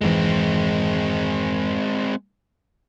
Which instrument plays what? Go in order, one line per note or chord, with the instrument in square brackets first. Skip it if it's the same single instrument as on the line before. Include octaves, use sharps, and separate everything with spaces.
[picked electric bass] F1 G#2 E3 [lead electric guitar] G#3 C4